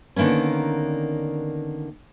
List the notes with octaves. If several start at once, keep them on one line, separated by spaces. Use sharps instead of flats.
D3 D#3 A#3 B3 C#4